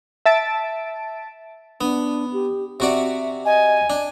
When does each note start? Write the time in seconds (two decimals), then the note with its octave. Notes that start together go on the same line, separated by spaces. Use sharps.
0.25 E5 A5 A6 D7
1.81 B3 D4
2.33 G4
2.80 C3 F#4 D5 E5
3.45 D#5 G#5
3.90 D4